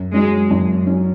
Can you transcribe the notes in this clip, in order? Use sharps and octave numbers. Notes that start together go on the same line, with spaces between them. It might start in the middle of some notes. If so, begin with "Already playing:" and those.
Already playing: F#2
F#3 G#3 C#4
F#2
F#3 C#4